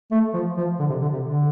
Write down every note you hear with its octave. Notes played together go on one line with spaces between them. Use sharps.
A3
F3
F3
D3
C3
D3
C3
D3